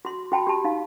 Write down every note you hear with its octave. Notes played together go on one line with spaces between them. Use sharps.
F#4 C6
F#4 G5 A5 B5
G4 A5
D#4 F5